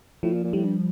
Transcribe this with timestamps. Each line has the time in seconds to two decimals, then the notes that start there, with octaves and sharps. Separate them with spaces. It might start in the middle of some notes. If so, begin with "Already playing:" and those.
0.23 A2 F3
0.33 A#2
0.44 A#2
0.53 A2 G3
0.64 G2